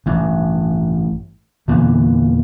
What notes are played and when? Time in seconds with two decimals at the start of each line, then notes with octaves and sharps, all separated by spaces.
0.06 A1 G2
1.68 E2 A#2 D3 E3